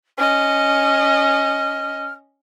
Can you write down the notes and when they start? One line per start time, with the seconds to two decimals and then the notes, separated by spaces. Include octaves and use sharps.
0.18 C#4 D#5 F6